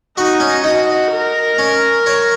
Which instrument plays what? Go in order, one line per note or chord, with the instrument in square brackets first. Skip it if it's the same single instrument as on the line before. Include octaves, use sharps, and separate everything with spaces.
[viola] D#4 [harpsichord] F#4
[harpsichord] C#4
[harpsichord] D#4 [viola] F#4
[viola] A#4
[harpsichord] C#4
C#5